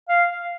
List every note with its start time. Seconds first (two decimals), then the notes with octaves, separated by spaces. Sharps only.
0.09 F5